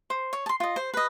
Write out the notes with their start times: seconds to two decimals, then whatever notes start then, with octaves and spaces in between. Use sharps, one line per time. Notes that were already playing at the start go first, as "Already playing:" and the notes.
0.10 C5
0.33 C#5
0.46 A5 C6
0.60 F4 D#5
0.76 C5
0.94 B4 D#5